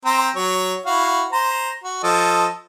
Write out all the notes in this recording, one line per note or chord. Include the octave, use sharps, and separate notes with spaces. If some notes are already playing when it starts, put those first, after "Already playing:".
C4 C5 A#5
F#3 C#5
E4 F#4 F5
C5 A#5
F#4
F3 A4 D#5